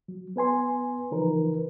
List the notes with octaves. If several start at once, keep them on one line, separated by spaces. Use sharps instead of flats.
F#3
B3 B4 G#5 C6
C#3 E3 F3 D#4 A#4 B4